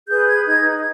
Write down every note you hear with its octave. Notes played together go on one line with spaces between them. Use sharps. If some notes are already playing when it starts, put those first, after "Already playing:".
G#4 B4 G6
G#6
D#4 G#6